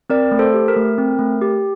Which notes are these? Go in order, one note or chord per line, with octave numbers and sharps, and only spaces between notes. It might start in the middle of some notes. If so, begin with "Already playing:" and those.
C4 A#4 D5
A3
A4 C5
G4
A#4
A3
C4
A3
G4